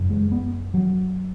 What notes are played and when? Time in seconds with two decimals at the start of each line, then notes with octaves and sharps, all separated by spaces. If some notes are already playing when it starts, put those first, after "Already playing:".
Already playing: F#2 C#3
0.10 G#3
0.32 B3
0.74 F#3